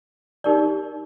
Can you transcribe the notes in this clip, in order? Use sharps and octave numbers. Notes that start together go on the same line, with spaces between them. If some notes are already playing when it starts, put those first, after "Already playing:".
D#4 G4 A#4 D5